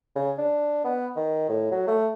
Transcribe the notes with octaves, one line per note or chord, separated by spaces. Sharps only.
C#3
D4
B3
D#3
A2
F#3
A3